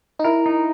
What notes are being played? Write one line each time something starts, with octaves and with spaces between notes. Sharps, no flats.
D#4
E4 A#4
D#4